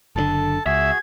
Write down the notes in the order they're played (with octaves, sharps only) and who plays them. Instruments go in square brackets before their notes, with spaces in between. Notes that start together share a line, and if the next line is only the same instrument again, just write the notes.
[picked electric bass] F#1 A2 D3 [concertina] A4 A5
[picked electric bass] C#2 [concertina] F#4 G#4 [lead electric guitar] E5 [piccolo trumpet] G#6